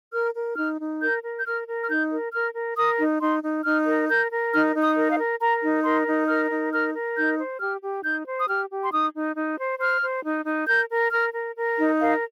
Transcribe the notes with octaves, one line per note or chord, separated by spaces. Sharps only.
A#4 F6
A#4
D#4 F6
D#4
A#4 G6
A#4
G6
A#4 F6
A#4
F6
D#4 G6
A#4
A#4 F6
A#4
A#4 D#6
D#4
D#4 C6
D#4
D#4 F6
A#4
A#4 G6
A#4
D#4 F6
D#4
D#6
A#4
F5
A#4
A#4 A#5
D#4
A#4 C6
D#4
A#4 F6
D#4
A#4 F6
A#4
D#4 G6
C5
G4 F6
G4
D#4 G6
C5
D#6
G4 F6
G4
C6
D#4 D#6
D#4
D#4
C5
C5 F6
C5
D#4
D#4
A#4 G6
A#4
A#4 F6
A#4
A#4
D#4
A#4 F5